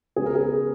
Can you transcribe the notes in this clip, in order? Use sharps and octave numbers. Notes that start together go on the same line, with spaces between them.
C#3 G#3 B3 G#4
A#4
G#4